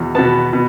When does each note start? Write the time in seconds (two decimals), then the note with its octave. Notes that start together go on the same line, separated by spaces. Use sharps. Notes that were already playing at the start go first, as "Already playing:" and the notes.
Already playing: E2 B2
0.15 B2 B3 A5
0.53 B2